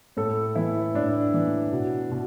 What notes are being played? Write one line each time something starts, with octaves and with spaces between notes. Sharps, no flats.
A2 A4
E3 E4
A2 D4
E3
B2
B2